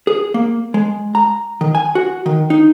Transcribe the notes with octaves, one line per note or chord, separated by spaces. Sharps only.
G#4
A#3
G#3
A#5
D#3
G#5
F#4
D#3
D#4